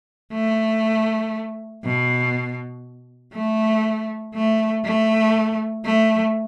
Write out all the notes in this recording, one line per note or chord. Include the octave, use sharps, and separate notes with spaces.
A3
B2
A3
A3
A3
A3